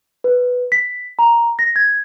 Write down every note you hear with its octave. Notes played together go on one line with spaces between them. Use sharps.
B4
B6
A#5
A#6
G#6